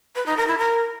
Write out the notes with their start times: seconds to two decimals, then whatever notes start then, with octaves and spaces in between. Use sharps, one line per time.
0.15 B4
0.26 D#4
0.37 A#4
0.47 E4
0.58 A#4